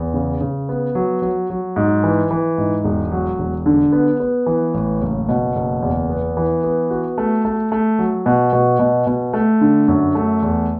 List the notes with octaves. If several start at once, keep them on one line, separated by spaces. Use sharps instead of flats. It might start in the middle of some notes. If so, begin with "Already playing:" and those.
Already playing: E2
C#3
C#3
B3
F#3
F#3
F#3
G#2
E3
E3
G#2
E1
F#3
E1
D3
B3
B3
E3
A1
F#1
B2
F#1
E2
B3
E3
B3
F#4
A3
A3
A3
F#3
B2
B2
B2
B2
A3
D3
F#2
A3
E2